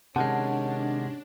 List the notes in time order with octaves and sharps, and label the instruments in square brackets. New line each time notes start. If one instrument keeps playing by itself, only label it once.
[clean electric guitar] C3 D#3 G#3 [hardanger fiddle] C#4 [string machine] D4 [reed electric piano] F#5 A5